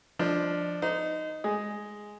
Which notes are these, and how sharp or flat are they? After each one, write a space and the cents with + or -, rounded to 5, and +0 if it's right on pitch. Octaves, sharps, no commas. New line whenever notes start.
F3 +0 D4 +5 D#5 -15
D#4 +0 C5 -35
G#3 +0 G#4 +0